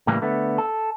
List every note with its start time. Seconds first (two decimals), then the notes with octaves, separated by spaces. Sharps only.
0.07 A2 C#3 E3 G3 A#3
0.22 D3 A3 B3
0.58 A4